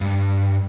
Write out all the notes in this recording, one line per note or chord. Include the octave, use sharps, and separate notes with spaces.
G2